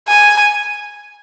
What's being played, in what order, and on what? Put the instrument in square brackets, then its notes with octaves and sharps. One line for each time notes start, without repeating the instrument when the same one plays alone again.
[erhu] G#5